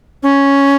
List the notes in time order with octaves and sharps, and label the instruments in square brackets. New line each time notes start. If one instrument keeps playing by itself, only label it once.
[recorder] C#4